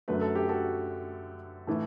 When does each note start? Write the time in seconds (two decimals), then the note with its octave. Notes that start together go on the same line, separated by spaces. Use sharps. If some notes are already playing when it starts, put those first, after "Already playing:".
0.08 F#2 D3 F#3 A3 B4
0.21 A4
0.35 G4
0.49 F#4 A4
1.67 A2 E3 A3